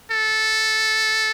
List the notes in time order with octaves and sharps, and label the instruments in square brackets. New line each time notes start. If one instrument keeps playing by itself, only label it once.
[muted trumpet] A4